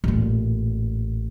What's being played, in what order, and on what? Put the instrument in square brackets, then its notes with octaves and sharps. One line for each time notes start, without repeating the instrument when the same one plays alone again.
[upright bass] A1 A#2